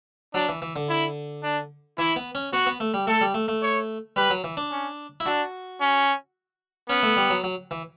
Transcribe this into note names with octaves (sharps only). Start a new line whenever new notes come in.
F#3 D4
E3
E3
D3
E4
D4
E3 E4
B3
C#4
B3 F#4
B3
A3
G3
A3 A4
G3
A3
A3
C#5
G3 B4
F#3
E3
D4
C#4
E4
D4 F#4
C#4
B3 C#4
A3
G3
F#3
F#3
E3